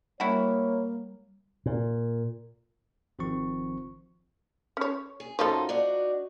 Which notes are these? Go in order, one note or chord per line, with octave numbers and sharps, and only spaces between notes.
G3 A#3 E4 F#4 C#5
A#2
G#1 D#3 F3 C4 C#6
C#4 C#5
G#4
F#2 F3 D#4 F4 A4
D4 D#4 F#4